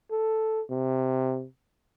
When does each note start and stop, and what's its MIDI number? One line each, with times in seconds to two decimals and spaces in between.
0.11 0.62 69
0.70 1.45 48